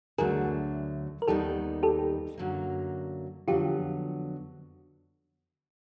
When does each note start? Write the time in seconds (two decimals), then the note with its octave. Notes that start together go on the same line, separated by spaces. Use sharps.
0.18 D2 D3 F#3 A3 G#4 A#4
1.22 A#4
1.28 D#2 D#3 G3 B3 D#4 G4 A4
1.83 G4 A4
2.38 F#2 D3 F#3 A#3
3.48 F2 D3 F#3 B3 F4 G4